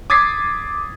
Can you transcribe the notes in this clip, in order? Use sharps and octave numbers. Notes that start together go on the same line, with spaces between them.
D6 D#6 G#6 A6 B6 C7